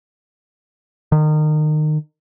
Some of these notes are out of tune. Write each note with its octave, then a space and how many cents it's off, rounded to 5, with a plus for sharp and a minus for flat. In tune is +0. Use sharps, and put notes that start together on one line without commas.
D#3 -30